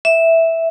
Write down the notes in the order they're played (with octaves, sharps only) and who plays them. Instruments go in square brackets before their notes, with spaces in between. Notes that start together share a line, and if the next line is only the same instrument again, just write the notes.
[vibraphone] E5